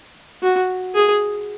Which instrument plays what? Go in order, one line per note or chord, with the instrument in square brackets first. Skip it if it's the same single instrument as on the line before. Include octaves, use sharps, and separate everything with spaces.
[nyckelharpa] F#4
G#4